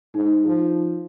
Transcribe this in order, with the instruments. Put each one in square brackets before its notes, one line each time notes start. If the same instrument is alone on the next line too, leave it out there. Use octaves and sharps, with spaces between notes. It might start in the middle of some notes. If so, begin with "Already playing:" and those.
[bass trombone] G#2 [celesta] D#4
[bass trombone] F3